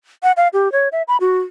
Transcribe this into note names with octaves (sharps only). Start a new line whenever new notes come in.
F#5
F5
G4
C#5
E5
B5
F#4